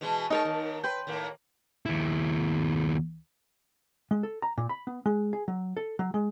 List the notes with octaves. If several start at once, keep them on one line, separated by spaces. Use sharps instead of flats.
B2 E3 G#3
G#3 D#4 A#4 C#5 A5
D#2
B4 G5 C6
D#2 A2 A#3
D#2 E4
G#3
A4
A#5
A#2
B5
B3
G#3
G#4
F#3
A4
F#3
G#3